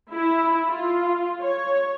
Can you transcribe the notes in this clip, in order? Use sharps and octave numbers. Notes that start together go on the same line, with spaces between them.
E4
F4
C#5